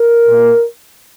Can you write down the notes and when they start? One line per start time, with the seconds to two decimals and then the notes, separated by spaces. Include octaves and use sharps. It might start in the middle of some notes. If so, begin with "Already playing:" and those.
Already playing: A#4
0.27 A#2 A#3